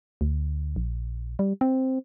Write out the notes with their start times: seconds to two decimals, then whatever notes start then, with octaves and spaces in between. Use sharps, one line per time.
0.21 D2
0.76 A#1
1.39 G3
1.61 C4